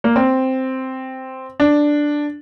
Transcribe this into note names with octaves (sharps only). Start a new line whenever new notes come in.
A#3
C4
D4